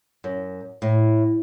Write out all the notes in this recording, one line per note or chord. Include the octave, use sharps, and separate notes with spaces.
F#2
A2